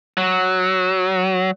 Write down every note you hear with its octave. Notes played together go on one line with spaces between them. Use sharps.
F#3